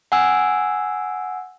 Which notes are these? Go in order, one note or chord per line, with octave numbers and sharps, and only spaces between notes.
F#5 G#5 E6